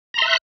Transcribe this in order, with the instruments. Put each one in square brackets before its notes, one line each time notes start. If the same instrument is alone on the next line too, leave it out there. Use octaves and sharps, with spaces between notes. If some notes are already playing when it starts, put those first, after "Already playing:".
[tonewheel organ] A#5
C6
E5
F#6